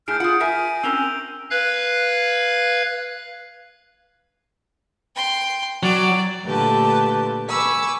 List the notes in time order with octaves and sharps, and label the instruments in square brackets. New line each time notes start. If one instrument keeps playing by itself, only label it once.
[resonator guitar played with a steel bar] A2 G#4 [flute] F6 [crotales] G6 D7
[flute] F4 [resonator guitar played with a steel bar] G#4 F#5 [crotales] D7
[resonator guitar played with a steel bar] A#4 E5 [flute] G#5
[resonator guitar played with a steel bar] C4 C#4 A#4 [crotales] E6 F7 G7
[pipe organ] B4 F5 F#6 G#6
[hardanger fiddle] G5 C6
[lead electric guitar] F#3 [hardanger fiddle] D5
[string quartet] A#2 D3 A3 G4 B4 A5
G#5 B5 C#6 D6 E6